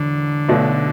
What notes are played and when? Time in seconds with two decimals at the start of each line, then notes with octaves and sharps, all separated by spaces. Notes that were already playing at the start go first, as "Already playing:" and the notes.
Already playing: E1 D3
0.49 B1 B2 A3 D4